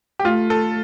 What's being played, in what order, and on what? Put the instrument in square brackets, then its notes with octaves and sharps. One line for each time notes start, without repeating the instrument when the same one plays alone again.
[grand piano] G4
[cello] A3 [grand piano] F4
[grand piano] A4